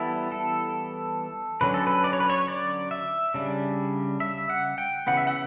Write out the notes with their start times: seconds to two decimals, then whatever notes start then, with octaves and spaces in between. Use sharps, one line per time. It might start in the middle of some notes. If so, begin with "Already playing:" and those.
Already playing: E3 G3 B3 E4 A4
0.32 A4
1.61 D3 F#3 C#4 B4
1.74 A4
1.87 B4
2.04 D5
2.13 C#5
2.20 B4
2.30 C#5
2.48 D5
2.91 E5
3.34 C#3 G3 D4
4.20 E5
4.50 F#5
4.78 G5
5.07 C#3 E3 B3 F#5
5.17 E5
5.27 F#5